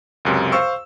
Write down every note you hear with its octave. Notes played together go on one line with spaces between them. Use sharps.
C#2 F#2 C3
C5 F5 C#6 E6